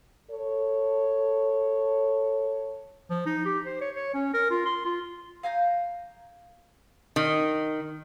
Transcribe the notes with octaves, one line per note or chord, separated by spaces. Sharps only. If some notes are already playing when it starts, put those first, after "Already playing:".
A4 C#5
F3
D#4
G4
C5
C#5
C#5
C#4
A#4
F4
C6
F4
F5 G#5 A#5 G6
D#3